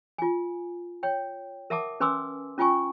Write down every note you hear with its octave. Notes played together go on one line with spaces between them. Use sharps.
F4 G#5
C#5 G5
A#4 E5 F#5 A5 D6 D#6
C#4 B4 G#5 C6 D6 E6
C#4 F4 G5 G#5 C#6